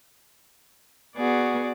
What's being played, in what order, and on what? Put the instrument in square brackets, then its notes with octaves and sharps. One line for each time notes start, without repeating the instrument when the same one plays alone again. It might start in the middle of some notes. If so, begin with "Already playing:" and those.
[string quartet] B3 G#4 [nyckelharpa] F#4 D5